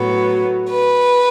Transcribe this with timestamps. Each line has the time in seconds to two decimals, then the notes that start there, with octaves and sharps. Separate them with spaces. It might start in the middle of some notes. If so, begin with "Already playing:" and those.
Already playing: A2 F#3 B3
0.69 B4